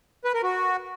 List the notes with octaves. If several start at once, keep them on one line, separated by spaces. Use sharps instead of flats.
B4
A#4
F#4